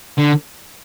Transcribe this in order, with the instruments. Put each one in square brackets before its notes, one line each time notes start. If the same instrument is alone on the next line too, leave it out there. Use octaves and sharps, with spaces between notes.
[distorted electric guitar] D3